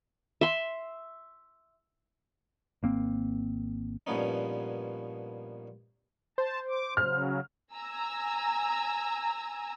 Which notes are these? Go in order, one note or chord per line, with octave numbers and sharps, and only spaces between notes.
E5 C6
G#1 A#3 C4
G2 A#2 F3 B3 C#4 D#4
C5 A5
D6
C#3 F#3 F6
G#5 A#5 E6